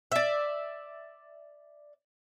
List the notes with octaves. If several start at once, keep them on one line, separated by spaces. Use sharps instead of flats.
D5 E5